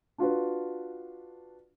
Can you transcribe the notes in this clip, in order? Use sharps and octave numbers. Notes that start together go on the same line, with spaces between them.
D4 F4 F#4 B4